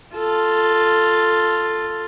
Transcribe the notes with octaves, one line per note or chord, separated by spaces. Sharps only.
F4 A4